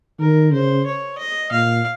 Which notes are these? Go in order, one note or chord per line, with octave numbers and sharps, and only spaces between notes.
D#3 A#4
C#3 C5
C#5
D#5
A#2 F5